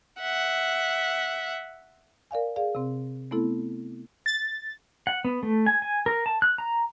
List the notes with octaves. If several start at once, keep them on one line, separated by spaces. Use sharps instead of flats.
E5 F#5
A#4 D5 F5 G#5
G#4 D5 F5
C3 C4
A3 B3 C4 E4 A4
A6
F#5
B3
A3
G#5
G#5
A#4
A5
F#6
A#5